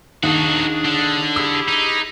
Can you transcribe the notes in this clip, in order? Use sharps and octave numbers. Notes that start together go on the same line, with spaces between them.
D#2 D4 D#4 F#4 G#4
D3
E4 G4 G#4 E6
D#4